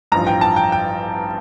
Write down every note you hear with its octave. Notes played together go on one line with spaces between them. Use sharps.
A1 G2 F3 A#5
G5
A5
G5
G5